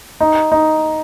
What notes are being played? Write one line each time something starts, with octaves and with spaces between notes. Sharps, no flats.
D#4
D#4